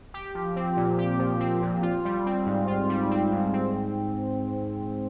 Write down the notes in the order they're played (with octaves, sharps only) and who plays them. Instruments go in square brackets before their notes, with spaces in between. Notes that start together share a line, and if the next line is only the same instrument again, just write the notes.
[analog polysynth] G4
F3
C4
A#2
G4
F3
C4
A#2
F4
G3
C4
G#2
F4
G3
C4
G#2
C4